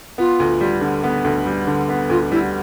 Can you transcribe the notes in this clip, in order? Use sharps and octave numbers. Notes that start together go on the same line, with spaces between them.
B3 F4
D2
G3
D3
B3
D2
G3
D3
B3
D2 F4
G3 E4